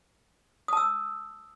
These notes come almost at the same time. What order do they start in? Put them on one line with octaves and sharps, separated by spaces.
D#6 A5 E6